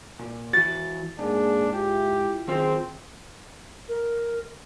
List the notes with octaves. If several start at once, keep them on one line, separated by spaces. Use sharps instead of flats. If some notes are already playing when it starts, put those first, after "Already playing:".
A#2
E3 F#4 A6
G#2 A#3 D4 G#4
E4 F4 G4
F#2 D#3 C4 F4 G#4
A#4